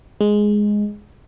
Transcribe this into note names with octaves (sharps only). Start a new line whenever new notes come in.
G#3